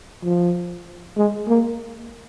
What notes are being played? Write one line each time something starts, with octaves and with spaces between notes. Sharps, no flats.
F3
G#3
A#3